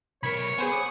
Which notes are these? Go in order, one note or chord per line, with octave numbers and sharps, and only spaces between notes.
B1 A#4 C#5 B5 G#6 B6
B3 G#4 C5 F#5 G#5
C#5 D6 D#6